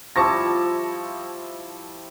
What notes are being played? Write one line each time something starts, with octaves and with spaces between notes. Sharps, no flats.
F3 G3 E4 A5 C#6 A#6